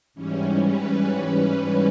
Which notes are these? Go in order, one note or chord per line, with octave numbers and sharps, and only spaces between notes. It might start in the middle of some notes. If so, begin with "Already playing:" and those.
G#2 E3 G3 C#4
B4
B4